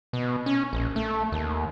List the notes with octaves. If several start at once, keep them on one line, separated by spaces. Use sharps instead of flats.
B2
C#4
A#1
A3
D#2